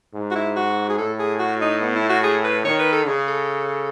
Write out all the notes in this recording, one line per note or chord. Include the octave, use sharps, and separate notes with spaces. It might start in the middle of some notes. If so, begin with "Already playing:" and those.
G#2
F#4
E4
F#4
G#4
A2 A4
G#4
F#4
D#4
B3
E4
F#4
G#4
B4
D#3 C#5
B4
A4
C#3 G#4
A4